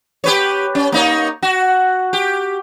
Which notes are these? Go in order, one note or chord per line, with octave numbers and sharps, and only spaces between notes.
G4 B4 C#5
C#4
A#3 D#4 C#5
F#4
G4